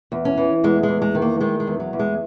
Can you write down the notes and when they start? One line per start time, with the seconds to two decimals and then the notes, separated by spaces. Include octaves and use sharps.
0.12 E2
0.25 C#4
0.37 E3
0.64 E2 G#3
0.83 G#3
0.89 E2
1.02 G#3
1.15 D#3
1.22 A#3
1.40 D#3 G#3
1.60 G#3
1.67 E2
1.80 F#3
1.93 E2
1.99 G#3